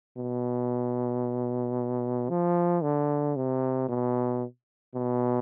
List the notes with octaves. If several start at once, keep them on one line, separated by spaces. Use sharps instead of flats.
B2
F3
D3
C3
B2
B2